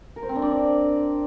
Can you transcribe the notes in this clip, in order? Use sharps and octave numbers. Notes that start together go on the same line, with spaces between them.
A#4
C5
C4
D4
D5